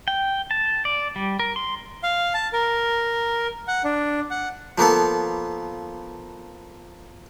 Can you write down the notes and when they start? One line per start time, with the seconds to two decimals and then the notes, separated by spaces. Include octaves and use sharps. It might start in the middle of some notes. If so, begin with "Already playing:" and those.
0.08 G5
0.51 A5
0.85 D5
1.16 G3
1.39 A#4
1.56 C6
2.03 F5
2.34 A5
2.53 A#4
3.68 F#5
3.84 D4
4.31 F#5
4.78 F3 A#3 B3 A4